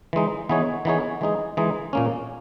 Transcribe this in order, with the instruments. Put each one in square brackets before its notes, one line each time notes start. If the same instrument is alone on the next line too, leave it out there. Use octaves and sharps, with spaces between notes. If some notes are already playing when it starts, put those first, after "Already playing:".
[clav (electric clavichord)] E3 G#3 D#4
E3 B3 D#4 G#4 C#5
E3 B3 D#4 G#4 C#5
E3 G#3 D#4 G#4
E3 G#3 D#4 G#4
A#2 A#3 C#4